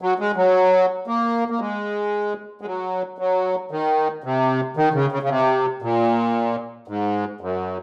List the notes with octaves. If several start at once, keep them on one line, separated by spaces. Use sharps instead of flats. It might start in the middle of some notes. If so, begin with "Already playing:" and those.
F#3
G#3
F#3
A#3
A#3
G#3
G#3
F#3
F#3
D#3
C3
D#3
C#3
C#3
C#3
C3
A#2
G#2
F#2